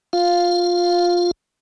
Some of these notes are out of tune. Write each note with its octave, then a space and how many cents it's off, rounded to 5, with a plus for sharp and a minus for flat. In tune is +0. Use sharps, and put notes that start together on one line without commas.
F4 +15 F5 +0